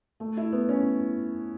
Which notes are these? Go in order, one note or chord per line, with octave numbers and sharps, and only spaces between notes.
A3
E4
B3
C#4